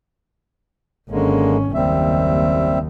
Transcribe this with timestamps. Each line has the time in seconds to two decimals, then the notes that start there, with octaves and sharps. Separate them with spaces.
1.10 G#1 D3 G#3 A#3 C#4
1.74 F#1 D#2 G3 C4 E5